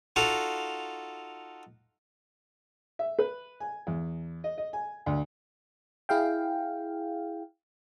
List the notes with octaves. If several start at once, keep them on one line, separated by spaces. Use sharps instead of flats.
D#4 F4 F#4 A4 F5
E5
B4
G#5
E2
D#5
D#5
G#5
D2
E4 G#4 F5 G5